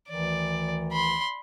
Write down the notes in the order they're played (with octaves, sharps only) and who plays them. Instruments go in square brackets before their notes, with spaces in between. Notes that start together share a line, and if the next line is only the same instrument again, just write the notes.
[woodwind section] D2 D#3 E3 [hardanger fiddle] D5
[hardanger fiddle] B5 C6